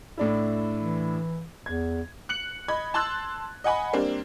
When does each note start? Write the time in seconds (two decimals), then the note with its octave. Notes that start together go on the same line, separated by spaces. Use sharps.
0.17 A2 D4 E4
0.78 E3
1.66 E2 G#6
2.29 F#6 C#7 F#7
2.68 D#5 B5 G#6
2.94 A5 C6 E6 F#6 A6
3.64 D#5 F#5 G#5 B5
3.93 G3 A#3 C4 D4